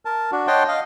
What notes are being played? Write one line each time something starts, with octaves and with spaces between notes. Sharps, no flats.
A#4 A5
D4 F#4
C#5 D#5 F#5 G5 A5 C6
D#5 F5